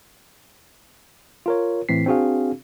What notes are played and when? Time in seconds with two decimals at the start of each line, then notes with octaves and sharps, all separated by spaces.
1.46 F4 A#4 C#5
1.89 A2 E3 C4 B6 C7
2.06 C4 D4 F#4 G#4 F5